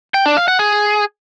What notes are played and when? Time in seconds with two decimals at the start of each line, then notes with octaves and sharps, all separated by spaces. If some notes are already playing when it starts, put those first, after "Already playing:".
0.14 G5
0.26 D4
0.37 F5
0.48 F#5
0.59 G#4